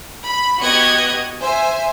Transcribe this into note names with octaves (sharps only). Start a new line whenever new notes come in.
B5
B3 F#4 G4 D#5 F#6 G#6
C5 E5 G#5